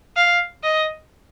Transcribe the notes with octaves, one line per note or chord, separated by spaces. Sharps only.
F5
D#5